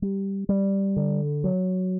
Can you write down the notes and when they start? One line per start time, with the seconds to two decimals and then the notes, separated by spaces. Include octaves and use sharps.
0.02 G3
0.49 G3
0.96 D3
1.44 F#3